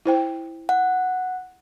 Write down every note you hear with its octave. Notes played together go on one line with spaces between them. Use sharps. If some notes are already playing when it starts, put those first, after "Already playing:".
E4 C5 G5
F#5